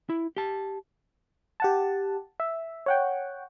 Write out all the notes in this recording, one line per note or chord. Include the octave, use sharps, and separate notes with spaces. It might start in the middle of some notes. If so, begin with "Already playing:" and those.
E4
G4 A5
G4 F#5 A5
E5
C#5 F#5 G5